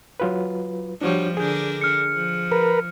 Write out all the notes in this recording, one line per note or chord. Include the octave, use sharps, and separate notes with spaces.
F#3 F4 B4
F3 G3 D4 F#4 C#5
D3 D4 G#4 A#4 G6
F6 C#7
F3
A#4 B4